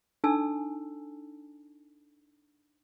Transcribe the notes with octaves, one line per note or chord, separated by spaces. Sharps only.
D4 D#4 A4 G#5 A5 E6